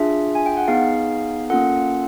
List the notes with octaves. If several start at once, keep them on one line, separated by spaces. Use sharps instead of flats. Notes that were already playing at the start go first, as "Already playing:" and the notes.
Already playing: D4 F4 G#4 E5
G#5
G5
F#5
B3 D#4 G#4 F5
A#3 C#4 F4 A4 F#5